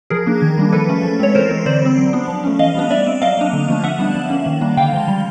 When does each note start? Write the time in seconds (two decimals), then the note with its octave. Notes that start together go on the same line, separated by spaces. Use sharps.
0.10 F3 G#4 A#4
0.26 A#3 D4
0.42 D#3
0.58 G3 A#3 D4
0.72 F3 A4 B4
0.89 A3 C#4
1.03 F3
1.19 G#3 C4 C#5
1.35 E3 A#4 C5
1.51 G#3 C4
1.66 D3 C5 D5
1.82 G3 C4
1.97 F#3
2.13 B3 D4
2.28 F3
2.44 A3 C#4
2.59 E3 D#5 F5
2.75 G3 B3 D4
2.91 G3 D5 E5
3.06 C4
3.22 F#3 D#5 F5
3.37 A#3 D4
3.53 D3
3.68 F3 A3 D4
3.84 D3 E5 F#5
3.99 G3 B3 D4
4.15 F3
4.30 A#3 C#4
4.46 D#3
4.61 G3 A#3 D4
4.77 D3 F5 G5
4.93 F3 G#3
5.08 G3